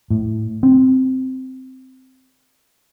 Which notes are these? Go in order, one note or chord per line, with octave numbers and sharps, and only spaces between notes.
A2
C4